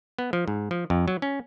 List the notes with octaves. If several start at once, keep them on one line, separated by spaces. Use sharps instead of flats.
B3
F3
G#2
F3
F2
F#3
C#4